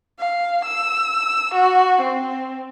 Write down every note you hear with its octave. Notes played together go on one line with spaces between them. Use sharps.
F5
E6
F#4
C4